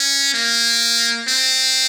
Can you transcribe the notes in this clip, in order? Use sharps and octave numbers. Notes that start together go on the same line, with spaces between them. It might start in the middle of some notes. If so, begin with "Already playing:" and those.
Already playing: C#4
A#3
C4